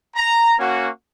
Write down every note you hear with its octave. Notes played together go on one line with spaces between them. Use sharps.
A#5
A#3 C#4 F#4